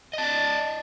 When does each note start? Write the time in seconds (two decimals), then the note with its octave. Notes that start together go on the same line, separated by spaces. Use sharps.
0.13 D#5
0.18 A5
0.23 D5